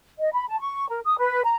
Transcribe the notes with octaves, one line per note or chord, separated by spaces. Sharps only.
D#5
B5
A5
C#6
A#4
D#6
B4
A#5